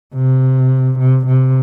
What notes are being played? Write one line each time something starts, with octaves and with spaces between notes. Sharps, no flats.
C3
C3
C3